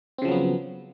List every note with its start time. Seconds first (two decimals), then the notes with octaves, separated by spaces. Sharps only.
0.18 C4
0.22 C#3
0.25 F3
0.28 F#3
0.32 B3